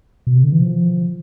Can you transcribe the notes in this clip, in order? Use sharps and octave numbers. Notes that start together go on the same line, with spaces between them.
B2
C3
D3
E3
F3